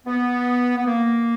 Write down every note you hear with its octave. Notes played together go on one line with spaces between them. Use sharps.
B3
B3
A#3